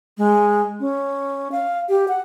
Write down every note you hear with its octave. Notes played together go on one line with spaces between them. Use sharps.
G#3
C#4
F5
G4
F#5